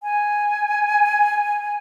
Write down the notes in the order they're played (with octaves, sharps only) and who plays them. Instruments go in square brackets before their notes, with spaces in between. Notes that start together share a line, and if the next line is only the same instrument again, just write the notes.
[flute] G#5